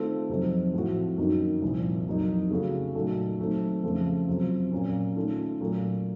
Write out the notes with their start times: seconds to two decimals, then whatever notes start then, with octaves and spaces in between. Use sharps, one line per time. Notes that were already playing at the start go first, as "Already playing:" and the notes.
Already playing: D#3 A3 C4 F4 A4
0.29 F2 C3 F#3 C4 D#4
0.74 A2 F3 A3 C4 F#4
1.18 F#2 D#3 A#3 D#4 F#4
1.62 C2 A#2 F3
2.07 F2 C3 F#3 A#3 D#4
2.51 C#3 A3 C#4 F#4 A4
2.95 A#2 F#3 A3 D#4 F#4
3.39 D#3 F#3 A3 C4
3.83 F2 C#3 F3 A3
4.28 C3 F#3 C4 F4
4.71 A#2 F#3 A#3 C#4
5.16 D#3 A3 C#4 F4
5.61 A#2 F#3 A3